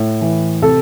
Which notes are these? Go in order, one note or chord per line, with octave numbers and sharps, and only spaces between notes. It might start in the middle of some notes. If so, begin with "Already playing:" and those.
Already playing: A2
E3
C3 A4